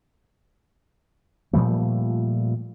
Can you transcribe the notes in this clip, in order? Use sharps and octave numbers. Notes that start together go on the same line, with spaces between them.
A#2 F3 G3 A3